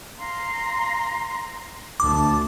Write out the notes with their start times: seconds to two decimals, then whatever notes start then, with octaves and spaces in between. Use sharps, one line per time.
0.18 F5 A#5 C6
2.00 D2 A5 D6